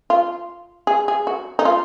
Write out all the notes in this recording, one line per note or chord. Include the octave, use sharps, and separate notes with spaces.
F4
G#4
G#4
F#4
D#4
F4